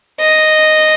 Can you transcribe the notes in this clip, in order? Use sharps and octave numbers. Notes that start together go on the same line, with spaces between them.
D#5